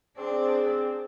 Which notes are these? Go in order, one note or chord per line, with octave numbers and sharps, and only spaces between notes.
C4 D4 G#4